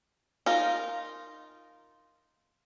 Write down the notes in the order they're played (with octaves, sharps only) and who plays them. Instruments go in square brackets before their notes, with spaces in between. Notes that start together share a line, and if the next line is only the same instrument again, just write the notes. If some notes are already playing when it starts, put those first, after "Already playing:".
[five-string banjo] D#4 F4 A#4